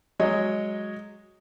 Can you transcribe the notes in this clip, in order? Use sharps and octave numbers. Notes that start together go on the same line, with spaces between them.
F#3 G#3 C#5 D#5